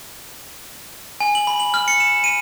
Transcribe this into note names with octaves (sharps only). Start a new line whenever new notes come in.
G#5
F#7
B5
F#7
F6
C#7
E7
D#7